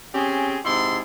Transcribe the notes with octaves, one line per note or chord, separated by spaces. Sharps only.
C4 C#4 G4 G#4
G#2 C3 E4 C6